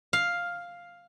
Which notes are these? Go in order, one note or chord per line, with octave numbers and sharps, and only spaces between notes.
F5